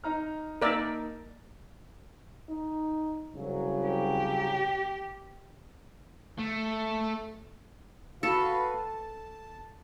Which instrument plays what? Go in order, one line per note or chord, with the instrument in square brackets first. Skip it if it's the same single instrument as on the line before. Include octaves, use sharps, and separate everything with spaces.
[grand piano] D#4 A#5 F6
[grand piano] A#3 D#4 [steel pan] A#4 D5 E5
[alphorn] D#4
[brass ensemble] C2 F#3 [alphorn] C#3
[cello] G4
[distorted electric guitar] A3
[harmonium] F#4 B4 F5 [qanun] A4
[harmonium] A5